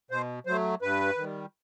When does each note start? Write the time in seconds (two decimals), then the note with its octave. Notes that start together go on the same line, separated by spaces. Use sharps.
0.11 B2 C5
0.46 F#3 A3 C5
0.82 G2 B4
1.17 D#3 G3